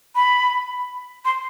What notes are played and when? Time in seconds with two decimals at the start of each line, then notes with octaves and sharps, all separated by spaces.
0.16 B5
1.25 C6